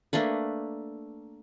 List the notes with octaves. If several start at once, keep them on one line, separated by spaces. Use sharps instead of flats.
A3 A#3 D4 B4